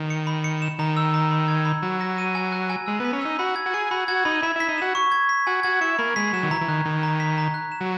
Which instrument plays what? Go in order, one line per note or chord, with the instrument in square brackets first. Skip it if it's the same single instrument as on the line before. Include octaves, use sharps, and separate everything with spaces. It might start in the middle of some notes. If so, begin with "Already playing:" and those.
Already playing: [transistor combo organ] D#3
[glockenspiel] C#7
B5
C#7
E7
[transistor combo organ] D#3 [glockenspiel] A#5
[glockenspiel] E6
A#5
B5
G#6
B5
[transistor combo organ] F#3 [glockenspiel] A#5
[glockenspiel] A#6
D#7
G#5
F#6
G#5
[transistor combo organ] G#3 [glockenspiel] E6
[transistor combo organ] B3 [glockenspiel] B6
[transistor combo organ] C#4
[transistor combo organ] D#4 [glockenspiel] E6
[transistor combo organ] F#4 [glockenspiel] B5
[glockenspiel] G#6
[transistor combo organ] F#4
[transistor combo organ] G#4 [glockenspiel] C#7
[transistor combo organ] F#4 [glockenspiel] B5
[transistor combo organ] F#4 [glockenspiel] G#6
[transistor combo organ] D#4 [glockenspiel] B5
[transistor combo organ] E4 [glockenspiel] B5
[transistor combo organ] E4 [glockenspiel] B6
[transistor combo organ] D#4
[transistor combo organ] F#4 [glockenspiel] E7
[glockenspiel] C#6
G#6
B6
[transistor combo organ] F#4 [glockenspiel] G#5
[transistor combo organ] F#4 [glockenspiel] G#6
[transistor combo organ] E4 [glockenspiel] C#7
[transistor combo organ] A#3 [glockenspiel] B5
[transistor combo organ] G#3 [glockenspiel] B6
[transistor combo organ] F#3 [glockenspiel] E7
[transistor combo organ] D#3
[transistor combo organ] E3 [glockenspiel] A#5
[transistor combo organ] E3
[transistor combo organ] D#3 [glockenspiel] F#6
[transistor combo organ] D#3 [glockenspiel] B6
[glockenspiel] A#5
B6
A#5
F#6
E7
[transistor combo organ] F#3